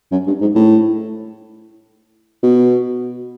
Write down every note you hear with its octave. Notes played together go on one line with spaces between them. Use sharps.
F#2
G2
G#2
A2
B2